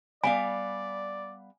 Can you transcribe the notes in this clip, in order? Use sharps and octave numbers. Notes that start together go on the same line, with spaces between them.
G3 B3 D5 F5 G#5